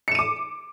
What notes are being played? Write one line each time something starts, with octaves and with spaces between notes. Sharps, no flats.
D6 C#7 D#7 E7